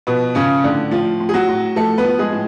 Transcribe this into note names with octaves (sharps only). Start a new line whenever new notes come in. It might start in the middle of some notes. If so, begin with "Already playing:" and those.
B2 F3 B3
C#3 F3 C#4
A2 D3 D4
A2 F3 F4
A2
G#4
F#3 F#4
A2
F3 A3 A4
B3 B4
F3
G#3 G#4
A2